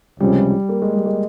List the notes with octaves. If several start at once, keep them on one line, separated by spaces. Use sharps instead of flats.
C#2 C3 F3 G3 G#3 C#4
A#3
G#3
G3
G#3